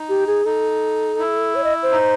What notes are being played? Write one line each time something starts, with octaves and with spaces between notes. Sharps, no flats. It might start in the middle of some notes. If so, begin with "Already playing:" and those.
Already playing: D#4
G4
G#4
D#4 A4
E4
C#5
D#5
C5
D#4